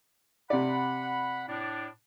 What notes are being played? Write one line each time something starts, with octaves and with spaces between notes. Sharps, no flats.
C3 D5 F#5 B5
A2 D4